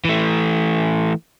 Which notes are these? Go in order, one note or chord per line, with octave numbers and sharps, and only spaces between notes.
E3 A3